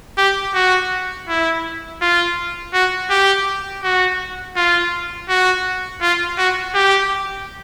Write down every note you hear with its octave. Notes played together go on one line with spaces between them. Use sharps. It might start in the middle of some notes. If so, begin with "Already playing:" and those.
G4
F#4
E4
F4
F#4
G4
F#4
F4
F#4
F4
F#4
G4